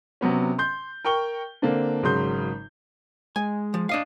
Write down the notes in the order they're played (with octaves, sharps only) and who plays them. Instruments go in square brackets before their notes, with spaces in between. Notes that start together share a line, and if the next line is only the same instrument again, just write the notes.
[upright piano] C3 F#3 B3 C#4
C6 G6
A#4 G5 C#6 G7
D3 A#3 C4 D4
G#1 C#3 F#3 C6 G6
[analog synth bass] G#3 [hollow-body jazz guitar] G#5
[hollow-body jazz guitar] F3
D4 D#5 F5